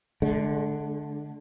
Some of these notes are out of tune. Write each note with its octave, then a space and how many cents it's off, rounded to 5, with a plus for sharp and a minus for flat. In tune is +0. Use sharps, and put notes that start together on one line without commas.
D3 +0 G#3 +45